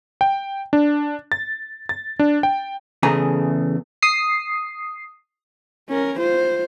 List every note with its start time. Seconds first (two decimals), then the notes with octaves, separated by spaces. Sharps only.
0.21 G5
0.73 D4
1.32 A6
1.89 A6
2.19 D4
2.43 G5
3.03 E2 C#3 A3 G#4 A#5
4.02 D#6 C7
5.89 C#4 A#4
6.20 F4 C5